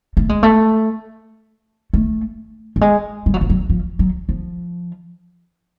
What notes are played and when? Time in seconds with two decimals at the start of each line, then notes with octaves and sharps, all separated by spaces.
0.17 A3
0.29 G#3
0.43 A3
1.94 A3
2.76 G3
2.81 G#3
3.26 G3
3.34 F#3
3.41 F3
3.50 F#3
3.70 F3
3.99 F#3
4.29 F3